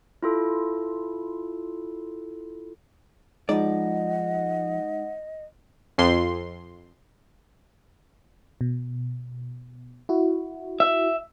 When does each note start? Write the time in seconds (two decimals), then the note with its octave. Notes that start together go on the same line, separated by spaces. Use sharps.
0.23 E4 F4 A4
3.49 F3 G#3 D#4 D5 D#5 F#5
5.98 F2 C6
8.61 B2
10.09 E4 F#4
10.80 E5